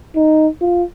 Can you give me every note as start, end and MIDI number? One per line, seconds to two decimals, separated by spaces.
0.15 0.47 63
0.61 0.83 65